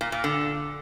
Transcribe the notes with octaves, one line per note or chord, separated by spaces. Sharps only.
A#2
A#2
D3